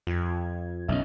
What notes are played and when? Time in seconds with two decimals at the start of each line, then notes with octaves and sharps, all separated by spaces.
0.07 F2 F4 G#6
0.88 B1 C#4 D#5 E5